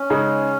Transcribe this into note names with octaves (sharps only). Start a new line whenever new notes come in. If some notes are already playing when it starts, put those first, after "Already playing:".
Already playing: C#4
C#3 G#3 D#4 G#4